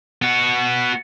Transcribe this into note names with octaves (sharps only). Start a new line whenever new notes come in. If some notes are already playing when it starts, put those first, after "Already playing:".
B3 F#4